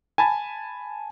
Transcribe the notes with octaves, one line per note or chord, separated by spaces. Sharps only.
G#5 A5 B5 A6